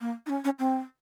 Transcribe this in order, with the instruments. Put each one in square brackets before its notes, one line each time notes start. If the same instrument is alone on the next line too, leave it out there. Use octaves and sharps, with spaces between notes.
[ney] A#3
D#4
C#4
C#4
C4